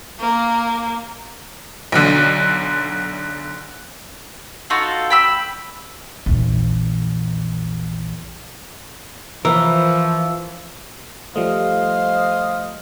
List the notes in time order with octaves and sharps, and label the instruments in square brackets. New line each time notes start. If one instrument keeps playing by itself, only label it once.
[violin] A#3
[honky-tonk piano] B1 D3
[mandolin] D#4 F4 F#4 A4
G5 B5 E6
[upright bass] A#1 E2
[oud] E3 [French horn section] F3 [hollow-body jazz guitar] A#4 [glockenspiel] E6
[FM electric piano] F3 G3 A3 [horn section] C5 D#5 F5